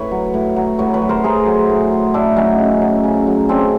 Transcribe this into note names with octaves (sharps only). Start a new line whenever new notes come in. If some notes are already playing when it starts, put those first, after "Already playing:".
Already playing: A2 B4 C#5
F#3
A2
F#3
A2 B4 C#5
B4 C#5
F#3
A#4 C5
A2 G#4 A#4
F#3
A2
F#3
A2 D4 E4
F#3 C#4 D#4
C#3
F#3
C#3
F#3
C#3 C4 D4